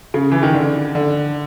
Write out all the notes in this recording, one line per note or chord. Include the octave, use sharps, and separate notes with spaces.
C#3
E3
D#3
D3
D3